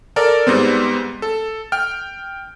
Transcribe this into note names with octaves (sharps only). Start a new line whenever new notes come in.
A4 A#4 D5
G#2 G3 B3 C4
A4
G5 F6